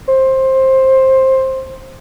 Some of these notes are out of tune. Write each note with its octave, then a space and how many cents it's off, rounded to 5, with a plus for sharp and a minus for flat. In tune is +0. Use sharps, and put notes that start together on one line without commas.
C5 +15